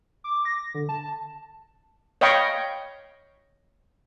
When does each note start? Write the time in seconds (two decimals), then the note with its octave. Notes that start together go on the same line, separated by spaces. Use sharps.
0.24 D6
0.45 A#6
0.74 D3
0.89 A5
2.21 C#5 D#5 F5 G5 B5 C#6